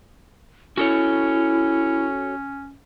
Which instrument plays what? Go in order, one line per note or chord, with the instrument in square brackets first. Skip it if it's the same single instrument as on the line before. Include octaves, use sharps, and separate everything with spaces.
[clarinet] C#4 [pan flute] E4 [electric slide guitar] F#4 A4 C#5